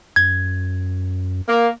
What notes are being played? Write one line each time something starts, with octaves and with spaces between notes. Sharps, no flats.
F#2 G#6
A#3